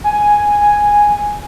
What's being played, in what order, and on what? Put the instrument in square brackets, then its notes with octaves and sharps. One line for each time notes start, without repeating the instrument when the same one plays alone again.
[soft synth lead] G#5